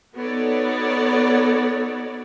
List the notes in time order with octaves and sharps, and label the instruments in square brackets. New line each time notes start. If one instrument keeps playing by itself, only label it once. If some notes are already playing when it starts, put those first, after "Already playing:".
[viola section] B3 D#4 F#4 A4 C#5 D5